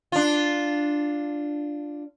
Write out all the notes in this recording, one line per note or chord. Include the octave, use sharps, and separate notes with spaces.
D4 F4